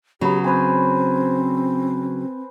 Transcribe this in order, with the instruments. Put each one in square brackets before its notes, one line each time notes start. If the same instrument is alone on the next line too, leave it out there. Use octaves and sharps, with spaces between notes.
[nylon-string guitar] C#3 F#3 [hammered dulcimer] B3 B5 [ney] G4
[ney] C4 [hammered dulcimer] B4 C5 G#5